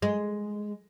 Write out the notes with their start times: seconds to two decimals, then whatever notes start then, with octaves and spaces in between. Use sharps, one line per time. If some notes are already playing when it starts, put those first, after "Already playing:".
0.02 G#3